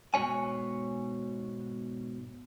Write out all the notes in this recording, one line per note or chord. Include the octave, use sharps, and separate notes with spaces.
G#2 B2 C#5 G#5